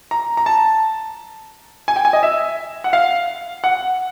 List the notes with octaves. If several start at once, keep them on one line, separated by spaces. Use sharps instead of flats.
A#5
A#5
A5
G#5
G5
G#5
D#5
E5
F#5
F5
F#5